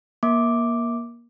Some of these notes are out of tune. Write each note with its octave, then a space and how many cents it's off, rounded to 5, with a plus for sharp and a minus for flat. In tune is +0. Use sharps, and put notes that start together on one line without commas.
A#3 +25 D6 +0